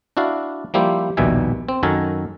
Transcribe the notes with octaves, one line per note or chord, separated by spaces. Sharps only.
D4 E4 F#4 D5 F5
F3 G3 A#3 E4 G4 C5
A#1 D#2 B2 G3 E5 G#5
C4
F#2 D#3 F#4 A4 A#4 G#5